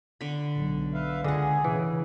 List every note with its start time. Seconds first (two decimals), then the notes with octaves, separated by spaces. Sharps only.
0.21 D3 B5
0.57 B1
0.94 B4 E5 F5
1.24 C#2 D3 G#4 D#5 F#5
1.64 C#3 E3